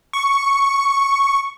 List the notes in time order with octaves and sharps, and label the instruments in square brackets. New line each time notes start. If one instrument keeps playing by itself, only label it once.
[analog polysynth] C#6